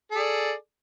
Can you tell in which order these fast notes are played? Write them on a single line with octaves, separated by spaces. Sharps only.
A4 G#4 D5